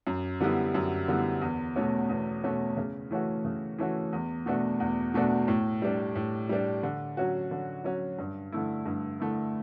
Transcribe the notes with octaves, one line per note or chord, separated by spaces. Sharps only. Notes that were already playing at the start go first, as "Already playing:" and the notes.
F#2
D3 G3 B3 E4
F#2
D3 G3 B3 E4
E2
B2 A3 C#4 F#4
E2
B2 A3 C#4 F#4
C#3
E3 A3 C#4 F#4
C#3
E3 A3 C#4 F#4
E2
B2 A3 D4 F#4
E2
B2 A3 D4 F#4
A2
G3 D4
A2
G3 D4
D3
F#3 C#4 F#4
D3
F#3 C#4 F#4
G2
D3 A3 E4
G2
D3 A3 E4